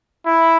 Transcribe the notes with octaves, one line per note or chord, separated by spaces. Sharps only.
E4